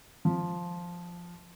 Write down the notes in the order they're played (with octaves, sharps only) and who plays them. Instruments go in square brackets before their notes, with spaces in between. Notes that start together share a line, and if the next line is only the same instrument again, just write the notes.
[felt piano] F3